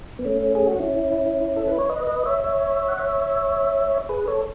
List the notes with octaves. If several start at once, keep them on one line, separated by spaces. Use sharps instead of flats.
B3
A3 C#4
G#4
F#4
C#4 E4
A4
B4
C#5
B4 D#5
B4 D#5
C#5 E5
C#5 E5
F#5
C#5 E5
G#4 B4
A4 C#5